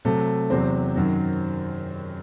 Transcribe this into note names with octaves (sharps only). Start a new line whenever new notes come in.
C3 F#3 A3
E2 C3 F#3 C4
F#2 D#3 F#3